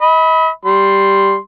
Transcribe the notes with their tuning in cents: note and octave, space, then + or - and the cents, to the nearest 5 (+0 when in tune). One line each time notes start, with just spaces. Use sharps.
D#5 +40 B5 +0
G3 +0 C6 +0